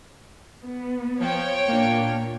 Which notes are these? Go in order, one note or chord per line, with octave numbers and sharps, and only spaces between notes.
B3
F3 C#5 G5
A#2 A#3 D4